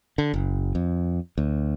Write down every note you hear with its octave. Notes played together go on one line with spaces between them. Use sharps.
D3
F#1
F2
D2